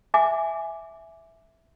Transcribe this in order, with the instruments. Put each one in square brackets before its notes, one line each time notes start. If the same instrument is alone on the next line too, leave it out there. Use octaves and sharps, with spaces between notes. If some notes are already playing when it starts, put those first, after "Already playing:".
[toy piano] E5 G#5 D6